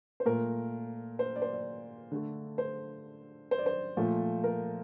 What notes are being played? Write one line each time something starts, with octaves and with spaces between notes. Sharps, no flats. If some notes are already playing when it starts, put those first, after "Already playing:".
C5
A#2 A3 A#4
C5
D5
C5
D5
D3 A3
C5
C5
D5
C5
A#2 F3 A3
A#4